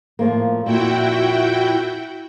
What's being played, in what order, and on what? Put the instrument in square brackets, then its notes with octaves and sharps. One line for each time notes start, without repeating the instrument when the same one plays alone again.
[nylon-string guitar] A2 F3 A#3
[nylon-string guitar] F2 A#2 [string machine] E4 F#4 G5